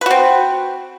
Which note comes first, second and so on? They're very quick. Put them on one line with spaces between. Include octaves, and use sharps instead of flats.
B4 F#4 C4